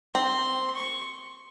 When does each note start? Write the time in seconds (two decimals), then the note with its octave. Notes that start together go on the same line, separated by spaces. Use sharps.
0.14 C4 C6
0.75 C#6